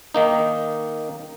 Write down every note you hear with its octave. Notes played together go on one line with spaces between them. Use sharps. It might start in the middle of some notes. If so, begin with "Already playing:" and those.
D#3 A#3 D#4